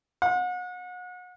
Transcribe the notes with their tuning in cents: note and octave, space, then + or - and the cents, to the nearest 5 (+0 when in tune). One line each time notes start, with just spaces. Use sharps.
F#5 -35